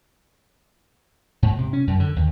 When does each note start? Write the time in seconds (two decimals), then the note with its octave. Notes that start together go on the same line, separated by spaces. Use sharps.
1.43 G#2
1.58 C3
1.73 C#4
1.87 F#2
2.00 D3
2.16 D#2